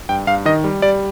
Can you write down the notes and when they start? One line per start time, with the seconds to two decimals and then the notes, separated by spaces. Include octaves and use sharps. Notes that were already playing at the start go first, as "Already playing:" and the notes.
0.09 G2 G5
0.27 G2 F5
0.45 D#3 D#5
0.64 G3
0.82 G3 D5